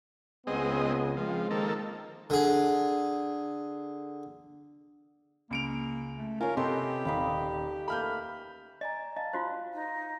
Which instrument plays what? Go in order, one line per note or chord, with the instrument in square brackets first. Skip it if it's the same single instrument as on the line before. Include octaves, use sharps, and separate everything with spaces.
[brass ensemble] C#2 B3 [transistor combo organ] G#3 C4 D#5
[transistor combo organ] F3 [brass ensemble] G#3 C4
[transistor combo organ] D#3 A#3 A4
[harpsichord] D3 G#4
[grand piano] C#2 D7 F7 [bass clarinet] A#3
[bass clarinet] A3
[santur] C#4 G#5 [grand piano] F4 [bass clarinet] A#4
[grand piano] C3 D#5 C6 [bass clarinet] G4 [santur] A4 B4 G5
[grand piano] D#1 [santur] D#4 F5 B5
[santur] A3 A#3 B4 [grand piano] B5 F6 G6
[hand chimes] D5 G#5 A#5 [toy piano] D#5
[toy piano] D#5 [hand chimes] F5 A5
[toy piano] F4 F#4 C5 [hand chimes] F5
[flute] D#4